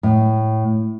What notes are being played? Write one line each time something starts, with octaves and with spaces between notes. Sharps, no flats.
A2